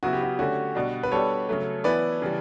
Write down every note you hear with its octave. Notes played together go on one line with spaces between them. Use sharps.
C#3 F#3 B3 E4 F#4
G4
F#4
D3 A3 C#4 F#4
B2 G3 D4
B4
G3 B3 D4 G4 A4 C#5
C#3 F#3 A3
E3 B3 E4 B4 D5
C#3 E3 G3